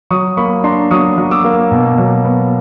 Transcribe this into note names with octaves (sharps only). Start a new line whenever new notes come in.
F#3 C#6 D#6
A#3 B5 C#6
D4 A#5 C6
F#3 C#6 D#6
F#3
D6 E6
A#3
B2
F#3
B3